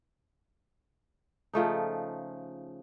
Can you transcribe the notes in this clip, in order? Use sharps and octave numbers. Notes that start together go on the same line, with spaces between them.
C#3 F3 A3 D#4